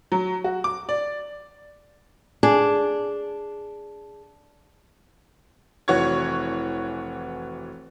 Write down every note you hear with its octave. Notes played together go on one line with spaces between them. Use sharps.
F#3
F#4
D6
D5
D4 G#4
F1 E3 F#4 C#5 C#6 G#6